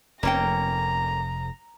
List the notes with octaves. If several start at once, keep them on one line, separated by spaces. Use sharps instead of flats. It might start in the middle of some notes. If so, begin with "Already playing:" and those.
F1 F2 A#3 C#4 G5 A#5